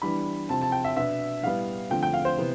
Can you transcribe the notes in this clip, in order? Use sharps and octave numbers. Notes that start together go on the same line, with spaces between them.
E3 G3 B3 D4 B5
C3 F3 C4 A5
A5
G5
E5
B2 B3 D4 E5
A2 G3 B3 F5
D3 F3 A3 C4 G5
G5
F5
C5
C3 E3 B3